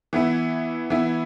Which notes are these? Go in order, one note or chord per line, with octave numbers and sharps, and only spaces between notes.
E3 B3 E4
E3 B3 E4